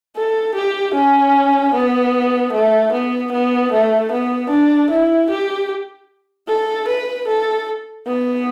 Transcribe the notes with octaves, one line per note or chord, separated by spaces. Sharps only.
A4
G4
C#4
B3
A3
B3
B3
A3
B3
D4
E4
G4
A4
B4
A4
B3